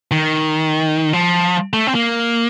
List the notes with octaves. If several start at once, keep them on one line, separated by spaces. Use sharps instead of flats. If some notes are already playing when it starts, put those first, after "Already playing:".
D#3
F3
A3
C4
A#3